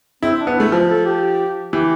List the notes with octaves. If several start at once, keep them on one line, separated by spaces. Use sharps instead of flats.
C4 E4
D4
B3
A3 E4
F3
A4
G4
E3 G4